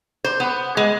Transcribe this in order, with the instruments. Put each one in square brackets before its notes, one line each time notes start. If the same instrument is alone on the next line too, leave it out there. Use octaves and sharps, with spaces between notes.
[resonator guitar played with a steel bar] C5
B3
G#3